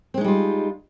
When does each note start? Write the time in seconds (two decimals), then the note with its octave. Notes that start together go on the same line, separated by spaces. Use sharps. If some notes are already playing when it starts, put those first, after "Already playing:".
0.14 C4
0.18 G#3
0.21 D#4
0.24 G3
0.28 F4